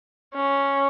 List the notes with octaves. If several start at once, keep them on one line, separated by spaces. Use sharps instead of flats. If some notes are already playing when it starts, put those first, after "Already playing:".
C#4